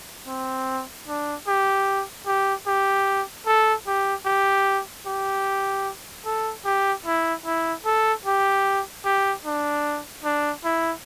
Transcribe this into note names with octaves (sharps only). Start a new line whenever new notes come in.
C4
D4
G4
G4
G4
A4
G4
G4
G4
A4
G4
E4
E4
A4
G4
G4
D4
D4
E4